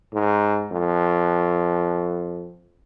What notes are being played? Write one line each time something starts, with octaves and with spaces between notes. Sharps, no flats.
G#2
F2